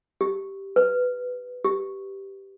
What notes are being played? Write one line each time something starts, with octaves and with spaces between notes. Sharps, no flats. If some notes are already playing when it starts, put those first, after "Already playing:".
G4
B4
G4